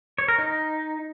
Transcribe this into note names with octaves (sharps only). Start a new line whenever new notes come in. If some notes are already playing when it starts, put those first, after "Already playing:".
C#5
A#4
D#4